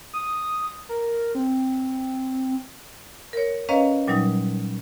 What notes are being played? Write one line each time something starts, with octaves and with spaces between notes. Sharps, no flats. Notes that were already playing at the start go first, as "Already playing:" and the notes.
D#6
A#4
C4
A#4 C#5
C#4 B4 C#5 D#5 F5 A#5
A#2 F#3 G3 D#4